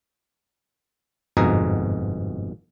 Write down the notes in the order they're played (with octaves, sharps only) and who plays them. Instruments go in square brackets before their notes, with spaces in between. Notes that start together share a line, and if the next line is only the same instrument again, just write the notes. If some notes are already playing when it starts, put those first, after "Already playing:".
[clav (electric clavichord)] G1 F2 G#2 B2 G#4 A#5